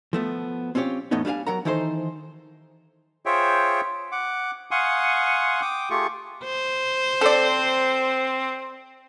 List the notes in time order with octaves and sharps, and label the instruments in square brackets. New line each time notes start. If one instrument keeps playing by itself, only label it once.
[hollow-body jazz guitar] F3 A3 B3
C4 C#4 F4 G4 C#5
E2 A2 A3 B3 C#4 D#4
G3 D4 E4 F5 G#5
F#3 A#4 F#5 A#5
D#3 E3 D#4 E4 A4 C5
[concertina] F4 G#4 C5 C#5 E5 G5
F#5 D6
F5 F#5 G#5 C6 C#6 D#6
G5 D6 D#6
A3 F4 G4 G#4 C#6
[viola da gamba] C5
[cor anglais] C4 [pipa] A4 D5